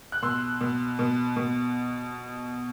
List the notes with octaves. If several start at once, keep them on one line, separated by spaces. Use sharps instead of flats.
F#6
B2 C6 E6
B2
B2
B2